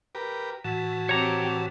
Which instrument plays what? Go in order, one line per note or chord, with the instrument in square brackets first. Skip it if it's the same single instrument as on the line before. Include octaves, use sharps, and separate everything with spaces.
[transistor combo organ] G4 A#4 B4
[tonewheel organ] A2 E3 [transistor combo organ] F#4 A5
[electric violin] C4 G4 [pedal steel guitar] C#5 A#5